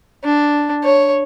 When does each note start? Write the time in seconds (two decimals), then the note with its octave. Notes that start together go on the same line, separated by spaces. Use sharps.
0.24 D4
0.84 C#5